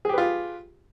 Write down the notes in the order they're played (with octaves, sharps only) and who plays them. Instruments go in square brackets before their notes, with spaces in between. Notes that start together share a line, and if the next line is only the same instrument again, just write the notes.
[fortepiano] G#4
G4
B4
F4